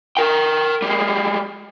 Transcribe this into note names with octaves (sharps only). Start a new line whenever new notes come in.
A#4 G5
G3 G#3